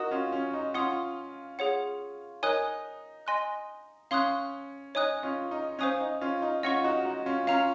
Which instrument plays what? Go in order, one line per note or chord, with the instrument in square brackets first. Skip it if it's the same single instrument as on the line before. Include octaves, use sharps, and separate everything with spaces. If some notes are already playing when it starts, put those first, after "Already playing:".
Already playing: [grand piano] D#4 F#4 [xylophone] A#4 D#5 A#5 D#6
[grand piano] C#4 F4
C#4
D#4
[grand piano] C#4 F4 [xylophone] F#5 C6 D#6
[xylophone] G#4 C#5 F#5
[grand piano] D#4 [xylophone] A#4 C#5 G#5 D#6 F#6
[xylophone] D#5 G#5 C6 F#6
[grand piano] C#4 [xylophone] F5 C6 D#6 F#6
[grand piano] D#4 [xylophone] C#5 G#5 D#6 F#6
[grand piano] C#4 F4
D#4
[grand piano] C#4 [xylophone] C5 F5 G#5 D#6 F#6
[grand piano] D#4
C#4 F4
D#4
[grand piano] C#4 F4 [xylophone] D#5 F#5 C#6
[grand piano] D#4 F#4
D#4 F#4
C#4 F4
[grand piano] C#4 F4 [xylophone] F5 A#5 F6